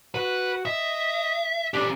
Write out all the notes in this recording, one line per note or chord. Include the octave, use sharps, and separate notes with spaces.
F#4 B4
D#5 E5
C#4 D4 G4